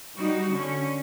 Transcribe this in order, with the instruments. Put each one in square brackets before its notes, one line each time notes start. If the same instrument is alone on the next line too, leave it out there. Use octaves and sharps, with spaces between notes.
[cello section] G3 D#4 F#4
D3 C#4